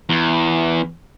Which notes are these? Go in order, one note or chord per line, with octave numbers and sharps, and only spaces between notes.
E2